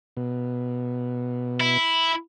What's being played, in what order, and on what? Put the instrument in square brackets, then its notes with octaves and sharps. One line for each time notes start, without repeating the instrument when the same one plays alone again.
[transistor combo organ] B2
[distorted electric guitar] E4